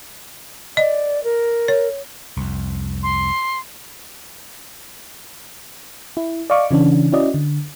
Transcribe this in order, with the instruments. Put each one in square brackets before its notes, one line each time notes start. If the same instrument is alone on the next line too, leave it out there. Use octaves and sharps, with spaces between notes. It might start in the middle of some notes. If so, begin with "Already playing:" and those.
[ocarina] D5 [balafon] D#5
[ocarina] A#4
[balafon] C#5
[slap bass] C2 F2
[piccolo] C6
[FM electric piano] E4
D5 D#5 F5 C#6 D6
C#3 E3 C#4 D4
C#4 E4 F#4 D5 D#5
D3